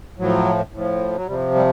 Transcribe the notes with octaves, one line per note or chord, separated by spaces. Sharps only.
A2 F3 F#3
A2 F3
F#3
C3 F3 G3
G3